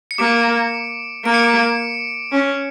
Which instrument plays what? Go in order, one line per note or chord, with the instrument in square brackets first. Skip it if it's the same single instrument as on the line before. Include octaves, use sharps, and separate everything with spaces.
[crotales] C#7
[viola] A#3 [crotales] D6 D7
[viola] A#3 [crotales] D7
[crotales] C#7
D6 D7
[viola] C#4